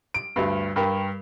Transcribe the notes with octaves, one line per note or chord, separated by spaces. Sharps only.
D7
D2 G2
G2 G4 A#4